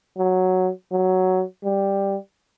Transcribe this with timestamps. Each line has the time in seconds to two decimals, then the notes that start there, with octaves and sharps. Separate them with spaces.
0.18 F#3
0.92 F#3
1.64 G3